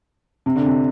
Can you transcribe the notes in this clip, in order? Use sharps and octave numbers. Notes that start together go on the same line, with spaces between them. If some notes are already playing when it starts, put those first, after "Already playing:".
C3
D3
C3